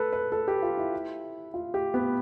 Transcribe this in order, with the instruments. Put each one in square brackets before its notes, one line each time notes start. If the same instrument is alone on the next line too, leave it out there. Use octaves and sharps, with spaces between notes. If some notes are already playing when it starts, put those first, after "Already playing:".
Already playing: [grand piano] A4 B4
B4
A4
G4
F4
E4
F4
G4
B3